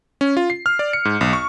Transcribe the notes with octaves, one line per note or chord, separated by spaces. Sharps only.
C#4
F4
C7
F6
D5
C#7
G#2
B1
C#6